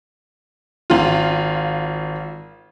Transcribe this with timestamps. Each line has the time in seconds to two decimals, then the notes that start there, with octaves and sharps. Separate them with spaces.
0.90 G#1 F4